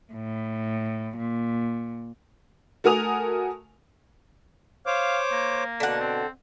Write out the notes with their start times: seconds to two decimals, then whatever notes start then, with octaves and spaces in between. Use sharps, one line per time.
0.13 A2
1.17 A#2
2.84 A3 F#4 A#4 G#5 D#6 F7
4.86 C5 C#5 F5 D6
5.32 A#3
5.80 B2 D3 F#5
6.00 C4